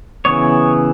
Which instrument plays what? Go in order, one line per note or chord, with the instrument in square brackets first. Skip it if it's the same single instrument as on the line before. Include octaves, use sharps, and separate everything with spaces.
[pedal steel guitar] C#3 E3 B3 C#5